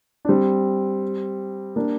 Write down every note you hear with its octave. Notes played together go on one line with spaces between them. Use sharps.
D4
G3 C4
A#3 D4